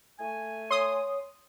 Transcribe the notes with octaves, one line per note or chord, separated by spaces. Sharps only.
A3 G#5
C#5 C6 D#6